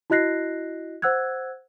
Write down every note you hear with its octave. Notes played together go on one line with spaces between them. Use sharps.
E4 F#4 D#5 F#6 A#6 C7
C5 F#5 E6 F#6 G#6